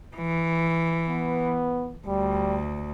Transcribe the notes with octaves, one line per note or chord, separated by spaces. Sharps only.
E3
B3
D2 G3